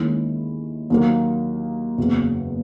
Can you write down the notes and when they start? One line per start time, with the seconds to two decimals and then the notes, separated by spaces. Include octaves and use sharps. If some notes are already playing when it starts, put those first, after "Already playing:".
Already playing: D#2 D#3 G#3 C#4 E4
0.90 D#2 D#3 F#3 A#3
1.98 F#1 E2 C#3 F#3